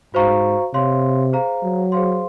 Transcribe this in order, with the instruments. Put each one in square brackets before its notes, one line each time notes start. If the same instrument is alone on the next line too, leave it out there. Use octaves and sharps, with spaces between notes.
[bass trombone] G#2 [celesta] F#4 C5 F5 A#5 C#6
[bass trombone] C3 [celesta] C#5 F5 C6
[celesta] G#4 C5 F5 A#5
[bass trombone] F#3
[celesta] G#4 C5 F5 C6